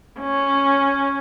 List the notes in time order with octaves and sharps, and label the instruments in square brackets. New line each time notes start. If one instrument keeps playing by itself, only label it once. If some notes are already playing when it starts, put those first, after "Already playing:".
[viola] C#4